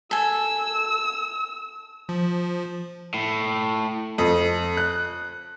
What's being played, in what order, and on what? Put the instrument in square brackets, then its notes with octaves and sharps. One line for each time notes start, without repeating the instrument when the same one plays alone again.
[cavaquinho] A4 G#5 [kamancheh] E6
[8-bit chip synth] F3
[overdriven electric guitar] A2
[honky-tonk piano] F2
F#6